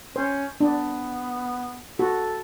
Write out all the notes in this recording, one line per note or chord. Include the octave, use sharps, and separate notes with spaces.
C#4 C5
B3 D4
F#4 A4